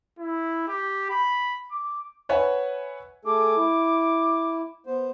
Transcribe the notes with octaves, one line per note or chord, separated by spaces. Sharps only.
E4
G4
B5
D6
B4 C#5 E5 F#5 G#5
A3 G#4 A4 D6
E4
B3 C5